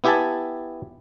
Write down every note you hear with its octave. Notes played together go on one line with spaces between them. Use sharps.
B3 E4 G4 E5 G#5 A5